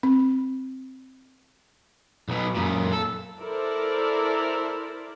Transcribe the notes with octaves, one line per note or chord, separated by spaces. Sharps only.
C4
B1 B2
F#2 A#2
A4
E4 A4 A#4 C5 D5